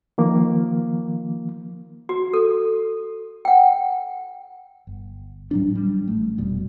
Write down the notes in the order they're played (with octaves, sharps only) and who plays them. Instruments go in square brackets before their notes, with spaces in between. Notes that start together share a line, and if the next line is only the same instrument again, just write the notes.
[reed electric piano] D#3 F3 A#3
[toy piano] F#4
A4
F#5 G5
[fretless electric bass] G1
A2 F#3 G3 D4
G3
A1 A3
F1 B2 G3